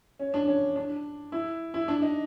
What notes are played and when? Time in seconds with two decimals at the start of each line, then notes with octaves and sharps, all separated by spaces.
0.19 C#4
0.34 D4
0.47 C#4
0.76 D4
1.32 E4
1.74 E4
1.88 D4
2.02 D#4